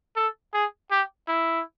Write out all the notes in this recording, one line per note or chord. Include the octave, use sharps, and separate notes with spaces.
A4
G#4
G4
E4